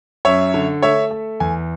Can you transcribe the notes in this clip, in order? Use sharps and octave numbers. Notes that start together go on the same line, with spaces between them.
F#2 C#5 E5
D3
A3 C#5 E5
A3
E2 G#5